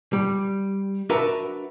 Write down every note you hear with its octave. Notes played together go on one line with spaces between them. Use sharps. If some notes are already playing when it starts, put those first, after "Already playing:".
G3
D4 F#4 A#4 B4 E5